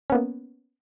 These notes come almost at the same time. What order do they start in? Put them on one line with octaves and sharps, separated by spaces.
C#4 B3 A#3